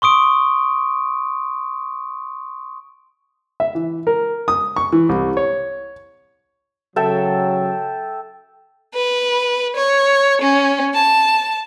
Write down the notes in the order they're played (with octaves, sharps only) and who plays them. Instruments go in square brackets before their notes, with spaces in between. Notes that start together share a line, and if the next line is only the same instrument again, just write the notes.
[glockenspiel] C6 C#6 D#6 D7
[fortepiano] E5
E3
A#4
D#6
C#6
E3
C2
C#5
[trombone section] C#3 F#3 [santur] A4 E5 G5
[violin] B4
C#5
C#4
A5